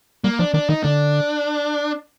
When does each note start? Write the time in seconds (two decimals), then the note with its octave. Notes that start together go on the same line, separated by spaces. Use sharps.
0.24 G3 A#3
0.39 F3 D4
0.54 D#3 D4
0.69 D#3 D#4
0.83 D3 D4